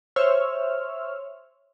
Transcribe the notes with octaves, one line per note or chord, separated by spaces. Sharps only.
C5 C#5 E5 E6 F6